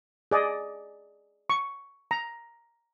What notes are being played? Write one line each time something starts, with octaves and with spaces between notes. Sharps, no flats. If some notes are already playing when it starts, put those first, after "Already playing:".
G#4 D5 D#5
C#6
A#5